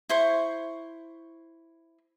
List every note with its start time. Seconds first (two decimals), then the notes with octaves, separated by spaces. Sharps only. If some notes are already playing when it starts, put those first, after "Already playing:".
0.09 E4 C5 C#6